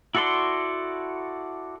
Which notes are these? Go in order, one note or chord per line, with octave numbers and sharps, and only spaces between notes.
E4 F#4 A4 D5 C6